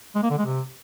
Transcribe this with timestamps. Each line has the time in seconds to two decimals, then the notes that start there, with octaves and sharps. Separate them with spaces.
0.15 G#3
0.23 A#3
0.31 D3
0.38 G#3
0.46 C3